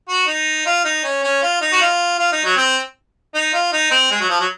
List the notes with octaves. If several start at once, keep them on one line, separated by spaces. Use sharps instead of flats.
F#4
D#4
F4
D#4
C#4
C#4
F4
D#4
F#4
F4
F4
D#4
F#3
C4
D#4
F4
D#4
C4
G#3
F#3
F3
F#3